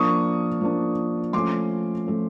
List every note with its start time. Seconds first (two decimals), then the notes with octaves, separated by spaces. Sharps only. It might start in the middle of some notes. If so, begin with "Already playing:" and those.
Already playing: F3 A#3 D4 C#6 D#6
0.61 F3 A#3 D4
1.33 F3 A3 C#4 C6 D6
2.06 F3 A3 C#4